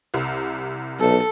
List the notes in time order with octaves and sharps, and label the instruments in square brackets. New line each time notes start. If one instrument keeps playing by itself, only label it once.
[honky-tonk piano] C2 C3
[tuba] B1 [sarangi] A4